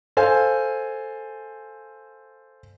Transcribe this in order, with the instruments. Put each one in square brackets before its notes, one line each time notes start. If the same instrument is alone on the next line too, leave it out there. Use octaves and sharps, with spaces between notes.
[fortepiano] A4 C5 F5 G#5